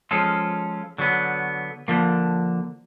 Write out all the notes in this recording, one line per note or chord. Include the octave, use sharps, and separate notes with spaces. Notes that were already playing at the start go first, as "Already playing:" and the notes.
F3 G#3 C#4 F4 A4
D3 F#3 B3
D3 F3 A#3